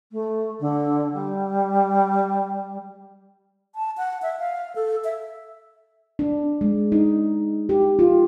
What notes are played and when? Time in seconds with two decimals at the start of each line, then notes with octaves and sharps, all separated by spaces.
0.12 A3
0.60 D3
1.14 G3
3.74 A5
3.98 F#5
4.22 E5
4.39 F5
4.76 A4
5.04 E5
6.19 D4
6.61 G#3
6.92 D#4
7.69 G4
7.99 F4